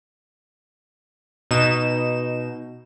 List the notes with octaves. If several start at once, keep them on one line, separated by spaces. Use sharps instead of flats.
B2 D#4 E7